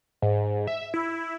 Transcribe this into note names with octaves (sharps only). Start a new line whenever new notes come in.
G#2
E5
E4